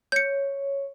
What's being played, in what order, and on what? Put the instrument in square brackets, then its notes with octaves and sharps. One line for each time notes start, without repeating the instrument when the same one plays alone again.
[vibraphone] C#5 [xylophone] G6 C#7